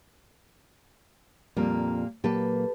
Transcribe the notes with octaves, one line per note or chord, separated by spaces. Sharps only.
F2 A#2 G3 A#3
A#2 F#3 A#3 G4 A4 B4